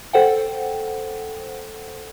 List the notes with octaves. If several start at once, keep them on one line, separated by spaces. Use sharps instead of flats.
A4 C5 F#5 G5